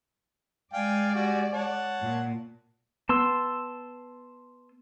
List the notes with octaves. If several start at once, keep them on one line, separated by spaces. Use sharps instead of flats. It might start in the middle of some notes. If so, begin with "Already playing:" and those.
G#3 D5 F5 G5 G#5
G3 F#4 G#5
C#5 F#5 A5
A#2
B3 A5 C6 E6